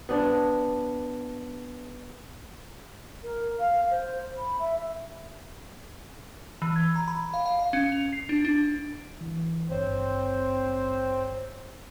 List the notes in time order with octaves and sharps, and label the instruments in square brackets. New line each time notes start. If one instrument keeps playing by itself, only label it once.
[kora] B3 D4
[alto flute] A#4
F5
C5
B5
E5
[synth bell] E3
G#6
A#5
B5
F5
F5
F5
C#4
F7
C7
D4
D4
[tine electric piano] E3
[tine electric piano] G#1 G2 C#5 [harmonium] C4 C5